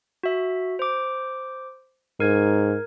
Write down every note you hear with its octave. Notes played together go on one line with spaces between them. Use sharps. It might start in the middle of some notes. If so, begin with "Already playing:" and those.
F#4 E5
C5 D6
G#2 A#4 G#6